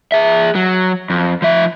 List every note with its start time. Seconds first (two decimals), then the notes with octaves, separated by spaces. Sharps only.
0.12 G#4 E5
0.55 F#3
1.10 F2
1.42 F3 E5